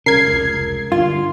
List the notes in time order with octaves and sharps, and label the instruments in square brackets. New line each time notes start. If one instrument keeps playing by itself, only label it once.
[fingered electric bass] C2 C#3 [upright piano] A#4 [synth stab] G#6 C7
[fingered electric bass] F1 C#2
[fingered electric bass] G2 D3 [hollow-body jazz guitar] F4